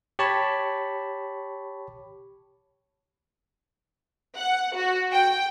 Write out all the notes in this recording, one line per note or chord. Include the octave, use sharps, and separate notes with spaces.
G4 C#5 A5 B5 C#6
F#5
F#4
G5